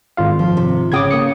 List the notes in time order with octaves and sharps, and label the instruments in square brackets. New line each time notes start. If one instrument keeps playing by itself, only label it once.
[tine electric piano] G#1 F4 F5
[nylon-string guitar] F3
C3
[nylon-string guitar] C#3 G#4 G5 [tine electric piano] D6 D#6 G#6
[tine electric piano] A#3 D#6 C#7